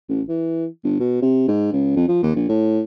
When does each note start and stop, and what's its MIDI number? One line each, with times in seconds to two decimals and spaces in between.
0.09 0.21 33
0.29 0.66 52
0.84 0.96 31
1.00 1.19 47
1.22 1.44 48
1.48 1.70 44
1.73 1.92 37
1.96 2.04 41
2.08 2.21 53
2.23 2.32 39
2.36 2.46 34
2.49 2.82 45